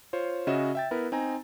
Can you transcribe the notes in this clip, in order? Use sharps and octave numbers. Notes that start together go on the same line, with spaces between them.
F4 C5 C#5
C#3 C#4 F#4 D#5 E5 E7
E5 G5 A6
B3 E4 A#4 B4
C4 D#4 G#5 A#5